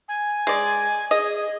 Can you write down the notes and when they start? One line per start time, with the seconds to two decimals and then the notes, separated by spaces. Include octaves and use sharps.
0.08 G#5
0.47 G#3 D5
1.11 G#4 D#5